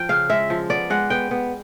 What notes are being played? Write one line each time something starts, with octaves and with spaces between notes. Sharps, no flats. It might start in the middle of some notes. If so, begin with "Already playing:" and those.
Already playing: F3 G5
C#3 F5
G#3 E5
F3
B3 D5
G#3 F#5
B3 G5
B3